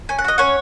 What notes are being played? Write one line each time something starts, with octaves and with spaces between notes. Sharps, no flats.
C#4 G#5
F#5
F#4 D#5
C#4 C#5 F#5